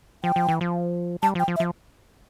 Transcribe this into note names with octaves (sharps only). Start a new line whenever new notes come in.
F3 G5
F3
E3
F3
G3 A5
F3
G5
F3
E5
F3